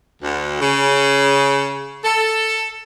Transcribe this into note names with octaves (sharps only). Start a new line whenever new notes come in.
D2
C#3
A4